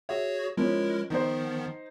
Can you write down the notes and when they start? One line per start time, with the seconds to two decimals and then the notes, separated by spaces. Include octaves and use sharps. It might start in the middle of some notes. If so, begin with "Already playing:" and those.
0.09 F#4 G#4 C#5 E5
0.57 F3 G#3 C#4 E4 A#4
1.10 D#3 F3 B3 D#4 C5